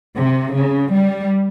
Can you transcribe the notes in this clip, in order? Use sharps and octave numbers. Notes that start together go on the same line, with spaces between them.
C3
C#3
G3